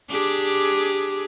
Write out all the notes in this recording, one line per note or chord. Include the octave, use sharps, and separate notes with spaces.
D4 G4 G#4